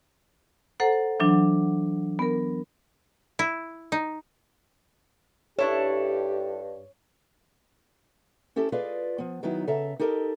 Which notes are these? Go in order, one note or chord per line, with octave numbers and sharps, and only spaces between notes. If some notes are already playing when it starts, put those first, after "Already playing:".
A4 C5 F#5 A#5
E3 F#3 D4
B3 A#4
E4
D#4
G2 D4 E4 G4 A4 C#5
C#4 E4 G4 A4
F4 G#4 B4 D5 D#5 F5
F3 B3
D#3 F#3 B3 D#4 E4
C#3 A4 E5 A#5
D#4 G4 A4 A#4 D#5